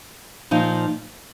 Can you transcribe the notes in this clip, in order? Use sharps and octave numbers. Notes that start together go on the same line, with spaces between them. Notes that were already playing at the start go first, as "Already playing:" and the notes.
A#2 F3 D#4